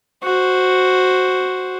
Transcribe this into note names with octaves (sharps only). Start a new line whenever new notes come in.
F#4 C5